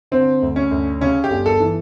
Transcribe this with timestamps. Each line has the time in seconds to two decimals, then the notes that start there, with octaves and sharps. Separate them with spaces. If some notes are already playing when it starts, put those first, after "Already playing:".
0.11 D3 C4
0.42 D2
0.56 C#4
0.71 D2
1.01 C#3 C#4
1.24 G4
1.30 G1
1.46 A4
1.60 E3